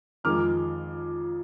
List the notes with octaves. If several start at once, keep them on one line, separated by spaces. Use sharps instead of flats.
F2 D#3 G#3 D6 F6